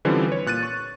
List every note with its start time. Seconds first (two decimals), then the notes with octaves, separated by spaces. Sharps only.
0.05 D3 E3 F3 G3 C4 C#4
0.28 B4 C#5
0.46 A#2 F#6 A6 D#7
0.63 C#6